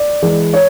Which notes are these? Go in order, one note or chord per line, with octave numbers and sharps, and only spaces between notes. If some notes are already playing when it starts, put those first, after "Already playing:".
Already playing: D5
E3 G#3
C#5